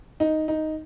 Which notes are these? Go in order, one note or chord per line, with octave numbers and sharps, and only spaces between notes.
D#4
D#4